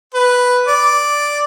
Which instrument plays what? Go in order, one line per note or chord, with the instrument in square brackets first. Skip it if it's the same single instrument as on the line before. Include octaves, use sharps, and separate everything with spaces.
[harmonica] B4
D5